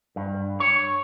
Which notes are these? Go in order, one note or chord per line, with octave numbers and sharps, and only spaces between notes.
G2
C#5